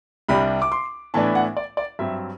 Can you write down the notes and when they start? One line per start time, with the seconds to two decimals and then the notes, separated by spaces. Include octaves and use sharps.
0.28 C2 C3 G3 D4 B5
0.62 D6
0.72 C6
1.14 A2 E3 B3 D4 A5
1.35 F#5
1.57 D5
1.77 D5
1.99 G2 F#3 C4 E5